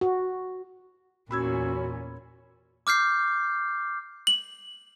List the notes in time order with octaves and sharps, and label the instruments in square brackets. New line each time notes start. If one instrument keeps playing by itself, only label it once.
[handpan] F#4
[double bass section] E2 C#4 [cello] A#2 [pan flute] F#4 [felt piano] B5 E6 G#6
[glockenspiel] D6 F6 G6 C7
[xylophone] F#7